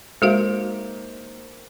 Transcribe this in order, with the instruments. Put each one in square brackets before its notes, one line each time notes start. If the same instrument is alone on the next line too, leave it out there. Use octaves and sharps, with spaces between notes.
[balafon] G#3 F#4 F5 [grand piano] A#3 D#4 C5